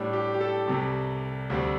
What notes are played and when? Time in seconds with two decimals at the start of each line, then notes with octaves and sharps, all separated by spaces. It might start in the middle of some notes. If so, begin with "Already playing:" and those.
Already playing: A2 G3 D4
0.13 G4
0.34 G4
0.41 A4
0.68 C2 C3 G3
1.50 D2 D3 G3 C4